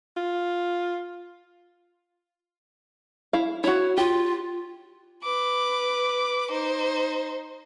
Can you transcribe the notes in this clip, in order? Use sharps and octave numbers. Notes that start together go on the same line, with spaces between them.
F4
E4 F5
E4 F#4 C#5
F4 G4
B4 D6
D#4 C5